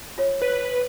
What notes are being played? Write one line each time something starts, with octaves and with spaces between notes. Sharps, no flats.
F4 C#5
B4